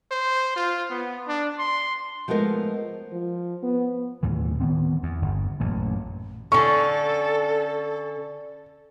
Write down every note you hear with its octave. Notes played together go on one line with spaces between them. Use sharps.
C5
F4
B3
D4
C6
F3 G#3 A3 B3 A#4
F3
B3
D#2 A2 E3
D#3 B3 C4
E2
G1
A1 F#2 A#2
D3 C#4 A4 C#6